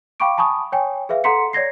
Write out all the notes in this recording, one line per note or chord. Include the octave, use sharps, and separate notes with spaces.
F5 G5 B5 C#6 D6 D7
G#5 A5 B5 C#6 D#6
C#5 G5 G#5
G#4 B4 E5 F5
A4 F#5 A#5 C6 B6 C#7
C#5 D5 G#6 A#6 C7